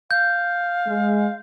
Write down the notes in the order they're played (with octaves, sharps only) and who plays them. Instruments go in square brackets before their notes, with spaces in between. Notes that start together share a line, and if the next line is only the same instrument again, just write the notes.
[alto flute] F5 [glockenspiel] G6
[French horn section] G#3